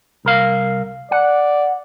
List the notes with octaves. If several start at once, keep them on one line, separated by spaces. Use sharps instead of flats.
C2 A#4 F5
D5 F#5